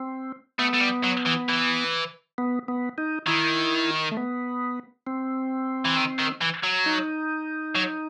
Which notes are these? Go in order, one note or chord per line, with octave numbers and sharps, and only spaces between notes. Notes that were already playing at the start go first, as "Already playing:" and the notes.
Already playing: C4
A3 B3
A3
G3
F#3
E3
E3
B3
B3
D#4
D#3 E4
A3
B3
C4
E3
D#3
D#3
E3
F#3
D#4
F#3